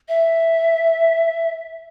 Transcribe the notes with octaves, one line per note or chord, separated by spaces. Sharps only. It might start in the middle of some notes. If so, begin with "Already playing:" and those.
E5